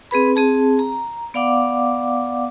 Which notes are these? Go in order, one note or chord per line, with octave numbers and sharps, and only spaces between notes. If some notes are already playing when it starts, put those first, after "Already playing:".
C4 G#4 B4 B5
C4 G#4 A5
A#5
B3 D5 F5 F#5 D6